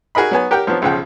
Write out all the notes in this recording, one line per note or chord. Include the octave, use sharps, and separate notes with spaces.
F#4 G#4 A#4 D#5 B5
F#3 B3 G#5
G4 A#4 F#5 G5
F3 F#3 B3 C4
B1 C#3 F3 F#5 G5